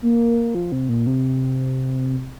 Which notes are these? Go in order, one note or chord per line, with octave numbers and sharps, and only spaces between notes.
A#3
F3
C3
A#2
C3